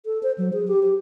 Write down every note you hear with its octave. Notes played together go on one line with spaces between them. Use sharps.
A4
C5
F#3
G#4
G4
G4